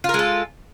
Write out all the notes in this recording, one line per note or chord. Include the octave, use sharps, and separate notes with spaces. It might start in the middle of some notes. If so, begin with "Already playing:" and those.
G#3 F4 A4 A#4